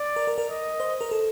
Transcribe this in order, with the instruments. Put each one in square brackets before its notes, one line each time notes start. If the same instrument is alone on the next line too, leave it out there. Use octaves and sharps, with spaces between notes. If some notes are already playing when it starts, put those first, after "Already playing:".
Already playing: [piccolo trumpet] D5
[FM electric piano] A#4
A#4
A#4
[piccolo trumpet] D#5
[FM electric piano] C5
A#4
A4